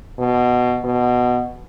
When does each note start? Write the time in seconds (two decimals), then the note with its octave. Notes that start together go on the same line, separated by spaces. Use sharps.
0.19 B2
0.84 B2